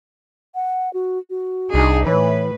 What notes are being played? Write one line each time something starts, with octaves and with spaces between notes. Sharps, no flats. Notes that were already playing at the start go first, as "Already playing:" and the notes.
F#5
F#4
F#4
C2 D4 D#4 G#4
A2 E3 B4 C#5